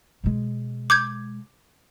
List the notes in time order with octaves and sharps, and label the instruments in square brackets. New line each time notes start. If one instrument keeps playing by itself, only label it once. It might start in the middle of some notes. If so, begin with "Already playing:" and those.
[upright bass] B2 G#3
[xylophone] D6 G6 G#6